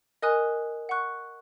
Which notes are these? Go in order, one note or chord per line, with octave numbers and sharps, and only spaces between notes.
A#4 D#5 G#5 D#6 F#6
F#5 C#6 F#6